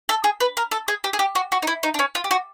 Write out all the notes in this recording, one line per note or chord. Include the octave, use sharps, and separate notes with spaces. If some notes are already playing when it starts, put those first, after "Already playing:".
A4
G#4
B4
A#4
A4
G#4
G4
G#4
G4
F#4
F#4
D#4
E4
D#4
D4
C#4
F4
G4
F#4